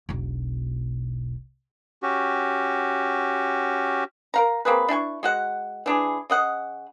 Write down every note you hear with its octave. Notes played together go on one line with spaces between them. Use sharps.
E1 B1
C#4 F#4 G4
A#4 F5 A#5
A#3 C4 G#4 B4
D4 E4 G#5 C#6
G#3 F#4 F#5
E3 D4 G#4
C#3 D#5 F#5